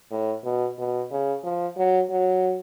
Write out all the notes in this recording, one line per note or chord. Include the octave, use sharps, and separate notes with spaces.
A2
B2
B2
C#3
F3
F#3
F#3